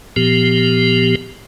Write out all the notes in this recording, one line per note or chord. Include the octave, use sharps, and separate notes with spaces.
A#2 F3 B3 G4